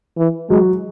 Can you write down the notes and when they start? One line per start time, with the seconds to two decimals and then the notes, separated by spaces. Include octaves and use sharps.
0.17 E3
0.50 F#3 G#3